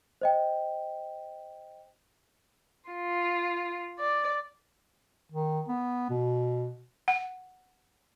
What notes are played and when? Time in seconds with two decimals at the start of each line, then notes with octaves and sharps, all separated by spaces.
0.21 C5 D#5 G5
2.91 F4
4.00 D5
5.32 D#3
5.68 B3
6.10 B2
7.08 F#5